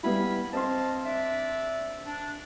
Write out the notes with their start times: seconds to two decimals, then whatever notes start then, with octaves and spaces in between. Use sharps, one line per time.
0.03 G3 B3 E4 F5 G#5 B5
0.53 C4 D#5 F5 A5 C6
1.05 D4 D5 E5
2.07 D4